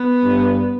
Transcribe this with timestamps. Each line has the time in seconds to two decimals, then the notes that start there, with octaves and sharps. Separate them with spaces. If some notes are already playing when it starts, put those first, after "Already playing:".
Already playing: B3
0.24 G2